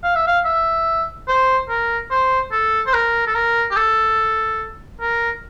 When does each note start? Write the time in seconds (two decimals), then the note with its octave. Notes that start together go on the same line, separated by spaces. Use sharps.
0.04 F5
0.15 E5
0.27 F5
0.45 E5
1.28 C5
1.69 A#4
2.11 C5
2.52 A4
2.86 C5
2.93 A#4
3.27 A4
3.35 A#4
3.71 G4
3.76 A4
5.01 A#4